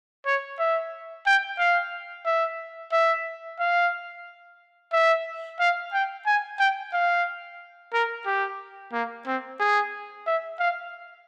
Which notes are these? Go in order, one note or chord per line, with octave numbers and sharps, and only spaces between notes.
C#5
E5
G5
F5
E5
E5
F5
E5
F5
G5
G#5
G5
F5
A#4
G4
A#3
C4
G#4
E5
F5